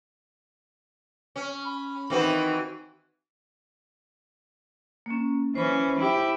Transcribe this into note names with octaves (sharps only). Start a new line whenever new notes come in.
C#4
B5
D#3 E3 C4 F#4
A#3 C#4
E3 C#4 C5 B5
E4 G4